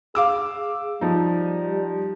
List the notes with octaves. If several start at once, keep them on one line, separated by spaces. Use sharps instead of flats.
G#4 F5 D6 E6
F3 G3 D#4